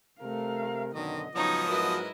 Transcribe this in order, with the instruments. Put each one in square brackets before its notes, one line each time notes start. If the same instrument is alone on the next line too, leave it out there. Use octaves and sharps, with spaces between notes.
[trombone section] C3 A#4 [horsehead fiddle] A3 F5
[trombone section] F#2 B2 D3 [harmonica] D#3 [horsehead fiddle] D#5
[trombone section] G#2 C#3 F#3 [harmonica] F3 B3 D#6 [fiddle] D#4 C#5
[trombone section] G#2 F#3 A#4 [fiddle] E4 D#5 [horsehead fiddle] F#4 B4